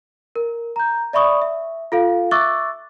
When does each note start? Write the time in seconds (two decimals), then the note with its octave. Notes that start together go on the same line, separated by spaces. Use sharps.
0.36 A#4
0.76 A#5 G6
1.13 D5 E5 B5 C#6 D#6
1.42 E5
1.92 F4 A4 F5
2.31 E5 C#6 D6 E6 F#6 A6